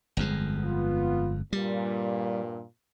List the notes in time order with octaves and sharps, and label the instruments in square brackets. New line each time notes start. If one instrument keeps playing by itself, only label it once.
[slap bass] G1 F2 G#3
[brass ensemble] B3 F4
[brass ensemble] G2 A#2 [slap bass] G3